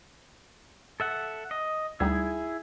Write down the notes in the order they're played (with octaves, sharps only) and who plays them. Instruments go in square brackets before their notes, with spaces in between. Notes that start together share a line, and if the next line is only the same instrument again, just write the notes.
[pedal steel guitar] A4 E5 F#5
D#5
[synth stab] D2 G3 D#4 [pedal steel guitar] E4 G#4